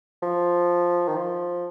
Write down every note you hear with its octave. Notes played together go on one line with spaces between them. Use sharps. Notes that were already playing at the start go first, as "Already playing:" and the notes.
F3
D#3
F3